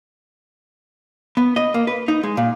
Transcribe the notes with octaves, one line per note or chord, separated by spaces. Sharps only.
B3
D#5
A#3
B4
D#4
G#3
A#2